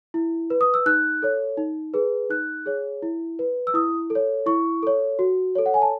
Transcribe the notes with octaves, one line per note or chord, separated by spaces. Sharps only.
E4
B4
D#6
E6
D#4 F#6
A4 C#5
D#4
G#4 B4
D#4 F#6
G#4 C#5
E4
B4
E6
E4 D#6
A4
C#5
E4 C#6
A4 C#5
F#4
A4 C#5
F#5
G#5
A5